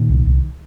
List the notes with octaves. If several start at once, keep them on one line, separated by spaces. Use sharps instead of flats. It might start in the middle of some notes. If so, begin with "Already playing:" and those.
Already playing: A#2 D#3
C2
C2